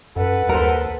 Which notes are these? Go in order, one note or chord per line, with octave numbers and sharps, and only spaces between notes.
F#2 A4 B4 F#5
D#2 A#4 C5